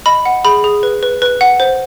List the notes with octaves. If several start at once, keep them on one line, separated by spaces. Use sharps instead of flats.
D#5 B5
F#5
G#4 B5
G#4
B4
B4
B4
F#5
C5